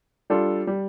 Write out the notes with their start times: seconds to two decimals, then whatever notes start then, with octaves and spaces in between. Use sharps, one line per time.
0.30 G3 D4 F4 A4
0.67 G3